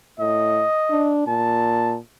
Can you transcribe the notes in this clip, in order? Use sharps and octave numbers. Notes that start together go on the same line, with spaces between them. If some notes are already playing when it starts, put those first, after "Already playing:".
A2 D#5
D4
A#2 A5